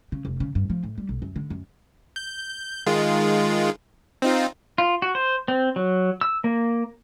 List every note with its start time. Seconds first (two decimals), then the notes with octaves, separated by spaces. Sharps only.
0.12 C#3
0.25 F1
0.40 C#3
0.55 G2
0.70 F3
0.83 A2
0.98 G3
1.09 B1
1.22 F#2
1.36 D3
1.50 F#2
2.16 G6
2.86 D#3 G#3 F4
4.22 C4 D#4 F4
4.78 F4
5.02 F#4
5.15 C5
5.48 C4
5.76 F#3
6.21 E6
6.44 A#3